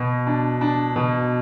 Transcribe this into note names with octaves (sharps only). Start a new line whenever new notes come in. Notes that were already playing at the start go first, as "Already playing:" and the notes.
Already playing: B2
D4
D4
B2